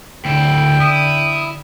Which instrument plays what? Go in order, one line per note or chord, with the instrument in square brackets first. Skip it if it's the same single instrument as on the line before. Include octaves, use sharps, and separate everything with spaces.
[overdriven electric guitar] D2 E4 [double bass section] D3 [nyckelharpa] G5
[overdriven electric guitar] E4 [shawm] D#6